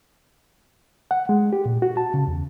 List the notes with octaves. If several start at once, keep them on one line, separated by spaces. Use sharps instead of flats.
F#5
G#3
G4
A#2
F#4
A5
C#3
E2